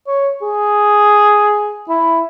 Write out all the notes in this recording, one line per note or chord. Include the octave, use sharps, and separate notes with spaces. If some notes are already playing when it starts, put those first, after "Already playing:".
C#5
G#4
E4